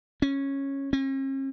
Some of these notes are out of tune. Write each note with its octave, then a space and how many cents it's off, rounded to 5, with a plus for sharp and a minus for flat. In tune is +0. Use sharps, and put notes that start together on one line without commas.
C#4 -10
C#4 -45